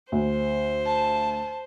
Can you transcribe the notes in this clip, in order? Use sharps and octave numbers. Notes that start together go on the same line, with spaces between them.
D2 C5
A5